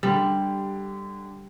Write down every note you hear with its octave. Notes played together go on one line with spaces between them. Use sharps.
D3 G3 G4